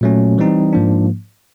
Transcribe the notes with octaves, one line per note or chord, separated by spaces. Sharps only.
A#2 F#3 A3 C#4
E3 G3 C4 D#4
G#2 F3 A#3 D4